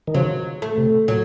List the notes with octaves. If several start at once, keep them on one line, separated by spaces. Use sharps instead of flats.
D#3
C#3 F3 F#3
A3
C3
A#2 F#3